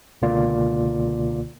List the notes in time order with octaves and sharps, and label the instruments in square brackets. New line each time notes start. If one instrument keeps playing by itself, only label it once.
[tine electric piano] C#2 B2 D3 A#3 F4 D5